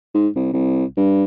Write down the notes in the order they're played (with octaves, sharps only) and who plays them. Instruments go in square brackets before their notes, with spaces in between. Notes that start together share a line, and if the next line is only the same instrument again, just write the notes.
[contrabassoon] G#2
C2
C2
G2